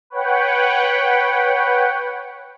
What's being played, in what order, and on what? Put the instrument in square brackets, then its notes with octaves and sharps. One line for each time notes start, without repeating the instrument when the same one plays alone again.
[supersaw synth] B4 C#5 F#5 G5